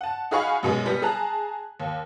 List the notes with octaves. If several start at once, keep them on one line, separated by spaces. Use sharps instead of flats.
F#5 A5
D#4 F#4 G#4 F5 B5 C#6
F#2 B2 G#3
G3 B3
G#4 A5 A#5 F#6
D#2